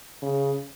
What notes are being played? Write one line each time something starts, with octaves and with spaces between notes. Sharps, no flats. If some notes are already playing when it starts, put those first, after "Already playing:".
C#3